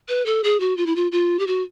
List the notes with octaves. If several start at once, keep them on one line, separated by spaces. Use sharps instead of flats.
B4
A4
G#4
F#4
F4
E4
F4
F4
G4
F#4